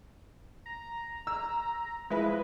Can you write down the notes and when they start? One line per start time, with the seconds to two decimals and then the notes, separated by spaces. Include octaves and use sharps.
0.66 A#5
1.27 E6
2.10 F3 G#3 E4 B4